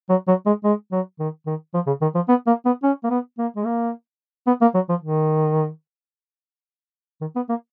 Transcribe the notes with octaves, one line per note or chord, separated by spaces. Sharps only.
F#3
F#3
G#3
G#3
F#3
D#3
D#3
F3
C#3
D#3
F3
B3
A#3
B3
C#4
A#3
B3
A#3
G#3
A#3
B3
A#3
F#3
F3
D#3
D#3
B3
A#3